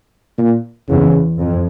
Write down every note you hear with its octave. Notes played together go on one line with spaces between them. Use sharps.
A#2
E2 C#3
F2